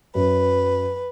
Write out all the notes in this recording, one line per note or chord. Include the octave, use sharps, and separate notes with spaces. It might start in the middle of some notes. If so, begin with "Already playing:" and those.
F#2 B4